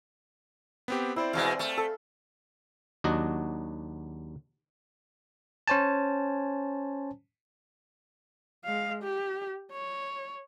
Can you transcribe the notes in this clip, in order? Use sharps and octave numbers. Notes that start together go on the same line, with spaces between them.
B3 C4 G4
C4 E4 C5 D5
E2 B2 G#3 E5 F5
A3
A4
D#2 F#3 D4 F#4 D#5
C#4 C5 C#5 G#5 A5
G#3 F5
G4
C#5